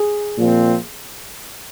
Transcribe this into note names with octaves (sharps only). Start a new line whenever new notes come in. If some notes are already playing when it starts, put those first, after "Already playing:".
Already playing: G#4
A#2 F3 C4